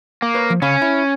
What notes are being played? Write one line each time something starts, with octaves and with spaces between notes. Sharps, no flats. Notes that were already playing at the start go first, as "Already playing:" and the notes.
A#3
B4 C#5
F3
C#3 C#4 F5 B5
E4